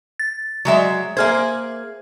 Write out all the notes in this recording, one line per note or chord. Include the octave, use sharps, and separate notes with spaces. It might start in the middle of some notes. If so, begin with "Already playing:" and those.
A6
F#3 G#3 E5
A#3 G#4 C5 E5 F6 G#6